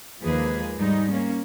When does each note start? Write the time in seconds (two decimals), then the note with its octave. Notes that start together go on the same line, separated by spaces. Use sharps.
0.22 D#2 F3 G#3 A#3 G#4 B4
0.76 G#2 G3 G#3 D#4
1.11 A#3 C#4